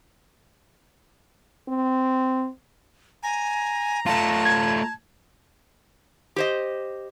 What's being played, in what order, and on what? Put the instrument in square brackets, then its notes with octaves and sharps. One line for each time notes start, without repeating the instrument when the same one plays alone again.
[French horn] C4
[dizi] G#5 [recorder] A#5
[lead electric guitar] A3 F4 [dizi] A5
[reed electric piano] G#6
[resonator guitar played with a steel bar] G4 C5 D#5